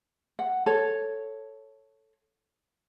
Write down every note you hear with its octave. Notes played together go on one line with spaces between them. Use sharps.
F#5
A4 C#5